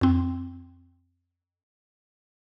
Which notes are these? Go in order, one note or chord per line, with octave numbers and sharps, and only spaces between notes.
F2 C4